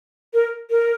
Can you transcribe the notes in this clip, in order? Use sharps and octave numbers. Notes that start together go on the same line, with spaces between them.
A#4
A#4